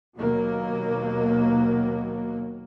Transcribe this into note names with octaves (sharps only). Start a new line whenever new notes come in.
D#2 B2 F#3 A#3